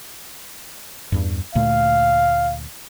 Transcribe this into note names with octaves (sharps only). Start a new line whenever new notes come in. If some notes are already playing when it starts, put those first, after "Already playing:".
E2 G2
D2 A#2 A3 F5